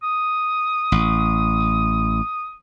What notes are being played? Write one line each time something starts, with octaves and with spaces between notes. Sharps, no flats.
D#6
A1